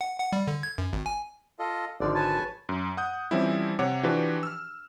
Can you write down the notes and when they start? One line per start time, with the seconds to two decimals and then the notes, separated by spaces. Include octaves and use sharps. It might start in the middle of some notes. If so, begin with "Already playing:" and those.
0.01 F#5
0.20 F#5
0.32 G3
0.47 D3
0.63 G#6
0.78 F#2
0.93 G#1
1.06 G#5
1.59 F4 A4 D#5
2.00 G#1 D3 F3 D5
2.15 B4 C#5 G#5 A5
2.69 F#2
2.97 F#5 D#6 G6
3.31 E3 F3 G3 C4 C#4 E4
3.79 C3 C#5 F#5 D6
4.03 E3 F3 D4 F#4 G4 B4
4.43 E6 F6